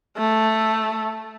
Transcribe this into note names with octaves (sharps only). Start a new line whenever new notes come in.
A3